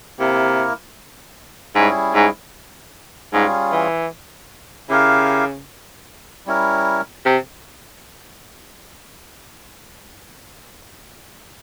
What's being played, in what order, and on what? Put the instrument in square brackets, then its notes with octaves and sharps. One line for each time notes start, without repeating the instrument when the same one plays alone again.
[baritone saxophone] C3 [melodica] A#3 E4 A#4
[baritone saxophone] G#2 [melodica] G3 C#4 E4 G#4
[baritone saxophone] G#2
[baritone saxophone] G#2 [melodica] G3 C#4 F4 G#4
[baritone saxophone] E3
[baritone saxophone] C#3 [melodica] E4 G4 A#4 F5
[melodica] G3 C#4 E4 A#4
[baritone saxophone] C3